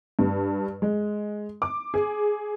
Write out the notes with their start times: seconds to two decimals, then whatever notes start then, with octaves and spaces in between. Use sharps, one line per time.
0.19 G2
0.82 G#3
1.62 D6
1.94 G#4